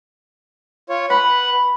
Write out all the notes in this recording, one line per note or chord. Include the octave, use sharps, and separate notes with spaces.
F4 C#5
B4 F#5 B5